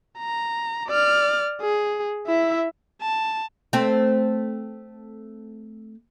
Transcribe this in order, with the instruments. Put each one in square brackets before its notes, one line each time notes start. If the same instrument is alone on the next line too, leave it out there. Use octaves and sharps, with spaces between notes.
[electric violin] A#5
D5 F6
G#4
E4 E5
A5
[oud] A3 C4